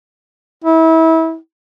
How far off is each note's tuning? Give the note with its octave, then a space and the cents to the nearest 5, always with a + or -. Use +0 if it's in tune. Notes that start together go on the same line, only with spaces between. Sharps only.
E4 -30